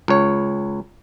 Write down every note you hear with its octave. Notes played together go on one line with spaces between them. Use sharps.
C#2 C#5